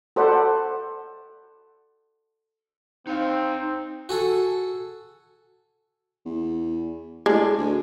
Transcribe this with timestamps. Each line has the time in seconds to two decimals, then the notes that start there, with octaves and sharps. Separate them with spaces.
0.16 F#4 A4 C5 D5 F#5 B5
3.07 C4 D#4 F5
4.09 F#4 G#4 A4
6.25 E2
7.26 A2 G#3 D4
7.58 D2